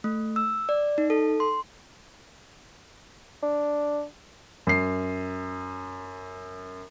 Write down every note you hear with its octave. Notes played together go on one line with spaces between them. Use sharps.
A3
E6
D5
D#4
A4
C6
D4
F#2 C7